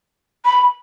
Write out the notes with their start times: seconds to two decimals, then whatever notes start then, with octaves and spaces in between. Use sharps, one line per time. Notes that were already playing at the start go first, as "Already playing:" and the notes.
0.45 B5